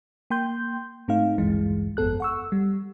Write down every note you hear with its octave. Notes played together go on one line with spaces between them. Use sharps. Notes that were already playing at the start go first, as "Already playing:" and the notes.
A#3 G5 C6 G6
G#2 A3 C4 D#4 F5
A1 D2 G2 E3 G#3
G1 F2 B3 A4 F#6
F#5 C#6 E6
G3